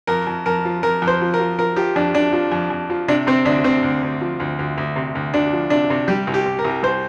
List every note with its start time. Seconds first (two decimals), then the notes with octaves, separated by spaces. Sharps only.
0.07 F2 A#4
0.27 F2
0.46 F2 A#4
0.65 F3
0.83 F2 A#4
1.02 F2
1.07 C5
1.21 F3
1.34 A#4
1.40 F3
1.58 F3 A#4
1.76 F3 G4
1.96 F2 D4
2.15 F2 D4
2.33 F3
2.52 F2
2.70 F2
2.90 F3
3.08 C3 D4
3.27 C3 C4
3.45 D2 D4
3.64 D2 C4
3.83 D2
4.03 D2
4.21 F3
4.40 D2
4.59 D2
4.77 D2
4.96 C3
5.15 D2
5.34 D2 D4
5.53 F3
5.70 C3 D4
5.90 C3
6.08 G3 G4
6.27 C2
6.34 G4
6.46 C2
6.59 A#4
6.65 C2
6.83 C2 C5